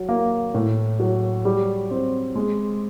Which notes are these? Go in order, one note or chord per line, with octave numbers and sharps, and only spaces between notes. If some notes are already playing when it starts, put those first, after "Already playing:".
Already playing: F#3
A#3
A2
F#3
G3
C4
G#3